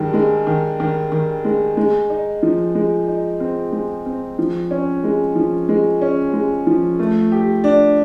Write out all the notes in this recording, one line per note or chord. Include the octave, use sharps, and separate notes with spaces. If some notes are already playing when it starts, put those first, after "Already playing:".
Already playing: G2 D#3 G#3
G#3
D#3
D#3
D#3
G#3
G#3
D#4
F3
G#3
D#4
C4
G#3
C4
F3
C#4
G#3
F3
G#3
C#4
G#3
F3
A3
G4
D4